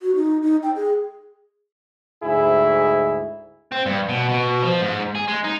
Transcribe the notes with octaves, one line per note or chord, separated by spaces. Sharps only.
F#4
D#4
D#4
G5
G#4
D2 G#2 E4 G#4
C4
G2
B2
B2
F3
G#2
G#4
G#3
D#4